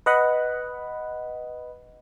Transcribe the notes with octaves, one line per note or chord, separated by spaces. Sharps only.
B4 D#5 F#5 B5